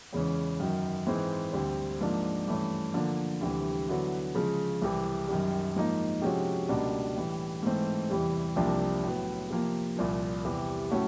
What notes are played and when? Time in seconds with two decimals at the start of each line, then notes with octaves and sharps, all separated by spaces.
0.13 E2 C#3 E3 G#3 C#4
0.60 F#2 D#3 F#3
1.07 G#2 E3 G#3 C4
1.53 D2 D3 G3 C4
2.01 G#2 F3 A#3 D4
2.47 G2 E3 A3 C#4
2.94 D3 F3 A#3
3.41 D2 C3 E3 G3
3.88 D3 F#3 B3 E4
4.35 C#3 F3 G#3
4.82 C2 C3 E3
5.28 F#2 D#3 G3
5.76 G#2 F3 A#3 D#4
6.22 C3 F3 G#3 C#4 F#4
6.69 C#2 B2 G3 A#3 D4
7.16 A2 E3 G3
7.63 G#2 E3 A3 C4
8.10 E2 C3 E3 G3
8.56 C2 C3 F3 A#3 D4
9.04 A2 F#3 B3
9.50 C3 F3 A#3
9.97 C2 A#2 F3
10.45 E2 C3 E3 G3 B3
10.91 A2 F#3 A3 C#4 F#4